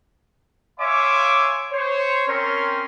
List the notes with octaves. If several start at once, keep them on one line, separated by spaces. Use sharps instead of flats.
C#5 E5 F5 G#5 C6 D6
C5 C#5
C4 C#4 A#4 C#5 C6